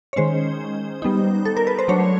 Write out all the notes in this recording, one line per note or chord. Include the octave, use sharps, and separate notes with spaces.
C#5
D#3 G#3 C#4 C5
G3 B3 D#4
A4
A#4
B4
C5
F#3 A3 D4 C#5